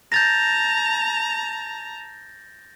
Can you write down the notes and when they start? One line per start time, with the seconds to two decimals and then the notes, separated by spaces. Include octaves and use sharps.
0.12 A5 A#5 G6 A6 A#6